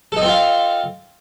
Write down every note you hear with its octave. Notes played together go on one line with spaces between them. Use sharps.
C4 D#4 F4 A4 F5